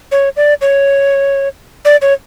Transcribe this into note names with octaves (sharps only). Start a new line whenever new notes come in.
C#5
D5
C#5
D5
C#5